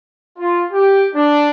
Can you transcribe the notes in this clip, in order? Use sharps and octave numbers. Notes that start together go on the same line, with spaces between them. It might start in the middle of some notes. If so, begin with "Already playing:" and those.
F4
G4
D4